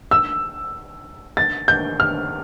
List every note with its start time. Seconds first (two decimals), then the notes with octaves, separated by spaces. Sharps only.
0.11 E6
1.37 A6
1.68 G6
2.00 F6